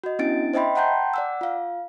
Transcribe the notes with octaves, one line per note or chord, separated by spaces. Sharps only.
F#4 D#5
B3 C#4 D4 E4 A6 D7
C5 D#5 E5 G5 B5 C6
F#5 G5 A5 A#5 C6 G6
D5 F#5 E6
F4 F5